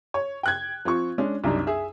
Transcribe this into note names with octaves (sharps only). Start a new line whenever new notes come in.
C#5
G5 F#6 G#6
F3 C4 F4 C#6
G#3 C#4 D4
C2 F#2 D4 D#4
G#4 E5